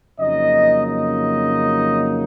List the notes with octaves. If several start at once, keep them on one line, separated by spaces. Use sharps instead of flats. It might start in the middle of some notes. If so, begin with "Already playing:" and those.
F2 C#3 F#3 A#3 D#4 D#5
D#5